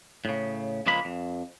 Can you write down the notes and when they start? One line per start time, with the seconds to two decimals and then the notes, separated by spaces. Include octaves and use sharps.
0.25 A2 C#3
0.86 C#2 F3 G#3 A#3 B5
1.05 F2